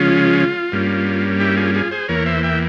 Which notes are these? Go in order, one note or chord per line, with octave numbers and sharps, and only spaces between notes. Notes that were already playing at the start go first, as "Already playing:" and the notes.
Already playing: C#3 F3 G#3 C#4 F4
G2 G3 A#3 C#4
E4 G4
F4 G#4
F4 G#4
G#4 C5
E2 E3 A#3 A#4 C#5
C5 E5
E5 G5